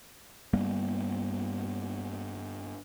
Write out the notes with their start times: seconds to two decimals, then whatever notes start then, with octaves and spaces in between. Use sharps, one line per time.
0.53 G2 G3 A#3 B3